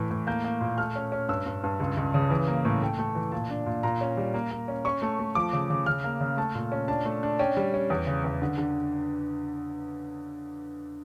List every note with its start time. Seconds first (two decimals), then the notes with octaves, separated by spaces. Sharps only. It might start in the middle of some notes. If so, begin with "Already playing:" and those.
Already playing: A2 E3
0.10 A2
0.27 A#3 G6
0.44 A#3
0.61 A#2
0.78 A3 F6
0.96 C#4
1.12 C#4
1.29 G2 E6
1.46 G2
1.64 G2
1.80 C#2
1.97 C#2
2.14 C#3
2.30 E3
2.48 A#3
2.65 A2
2.82 A3 G5
2.98 A3
3.15 E3
3.32 A#2 A5
3.50 D4
3.66 A#2
3.83 A#2 A#5
4.01 C#4
4.17 G3
4.34 A#3
4.51 A#3
4.68 C#4
4.85 C#4 C#6
5.02 A3
5.19 A3
5.35 F3 D6
5.53 C#3
5.70 C#3
5.86 C#3 F6
6.04 A#3
6.20 C#3
6.37 A3 A5
6.55 A#2
6.72 C#4
6.88 D4 A5
7.05 A3
7.23 D4
7.39 C#4 G5
7.57 G3
7.74 C#4
7.90 E2
8.07 C#3
8.24 E2
8.42 D3
8.58 D3